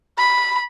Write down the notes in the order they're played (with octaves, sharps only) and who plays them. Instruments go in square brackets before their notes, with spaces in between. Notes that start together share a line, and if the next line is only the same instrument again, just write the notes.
[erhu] B5